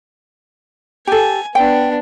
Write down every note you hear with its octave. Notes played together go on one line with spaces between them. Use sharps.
G4 A4 G#5
B3 D4 G5